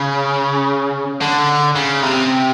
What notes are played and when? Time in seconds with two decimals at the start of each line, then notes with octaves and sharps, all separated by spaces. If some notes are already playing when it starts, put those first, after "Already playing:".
Already playing: C#3
1.21 D3
1.76 C#3
2.03 C3